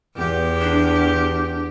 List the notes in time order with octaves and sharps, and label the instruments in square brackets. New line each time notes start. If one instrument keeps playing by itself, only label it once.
[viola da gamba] E2 G4
[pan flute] D4